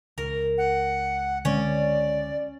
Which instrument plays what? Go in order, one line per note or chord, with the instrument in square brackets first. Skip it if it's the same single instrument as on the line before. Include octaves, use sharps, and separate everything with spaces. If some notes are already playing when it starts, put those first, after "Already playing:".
[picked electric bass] C#2 [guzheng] A#4
[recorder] F#5
[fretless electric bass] D3 G#3 C4 [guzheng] C#4 [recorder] D5